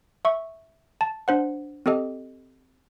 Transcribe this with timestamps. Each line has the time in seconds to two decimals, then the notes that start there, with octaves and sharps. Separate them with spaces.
0.25 E5 C#6
1.01 A5
1.28 D4 C5 F#5
1.86 C4 G4 A4 D#5